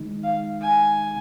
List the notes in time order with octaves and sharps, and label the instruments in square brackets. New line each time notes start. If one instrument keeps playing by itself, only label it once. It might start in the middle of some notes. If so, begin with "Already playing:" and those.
Already playing: [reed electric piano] D#3 G#3 D#4
[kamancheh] F5
G#5